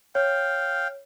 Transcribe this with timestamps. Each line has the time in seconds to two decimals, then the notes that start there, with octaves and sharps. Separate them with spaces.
0.15 C#5 F5 G5